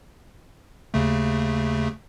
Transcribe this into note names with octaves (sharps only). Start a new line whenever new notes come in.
D#2 C#3 A3